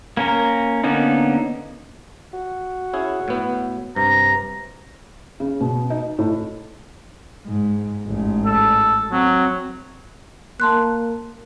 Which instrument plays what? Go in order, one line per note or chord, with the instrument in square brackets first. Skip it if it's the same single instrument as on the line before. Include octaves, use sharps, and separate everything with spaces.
[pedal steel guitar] A#3 C#4 A#4
D3 A#3 B3 C#4 D#4
[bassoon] F#4
[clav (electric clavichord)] C#4 E4 G#4
A2 B3
[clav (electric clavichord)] G2 [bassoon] C3 [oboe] A#5
[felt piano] C#3
B2
D#4
A2
[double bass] G#2
A1 G#2
[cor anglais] A4
[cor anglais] F#3 [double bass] C4
[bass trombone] A#3 [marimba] A5 C6 F#6